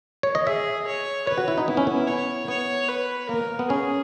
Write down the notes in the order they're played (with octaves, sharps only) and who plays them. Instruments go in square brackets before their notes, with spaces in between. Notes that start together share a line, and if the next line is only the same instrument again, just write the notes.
[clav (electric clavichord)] C#5
D#5
[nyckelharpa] G#4 [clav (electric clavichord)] E5
[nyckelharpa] C#5
[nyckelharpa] B4 [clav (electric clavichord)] C#5
[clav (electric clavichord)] F#4
E4
D#4
[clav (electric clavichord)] B3 [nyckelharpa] E4
[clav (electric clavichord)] C#4
B3
[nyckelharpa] C#5
[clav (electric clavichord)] B3 [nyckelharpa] C#5
[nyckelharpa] B4
[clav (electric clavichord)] A#3 [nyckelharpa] A#4
[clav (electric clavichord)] B3
[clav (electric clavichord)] C#4 [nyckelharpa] G#4